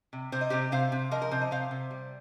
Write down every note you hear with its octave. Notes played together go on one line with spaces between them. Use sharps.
C3
C3 C5
D#5
C3 G4 C5
C3 C5 F5
C3
F3 A#4 D#5
A#4
C3 C5
D#5
C3 C5 F5
C3
G3